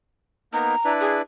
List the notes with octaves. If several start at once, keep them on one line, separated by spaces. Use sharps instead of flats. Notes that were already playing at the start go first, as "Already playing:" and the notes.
A#3 B3 D#4 A#5
D4 E4 B4
G#4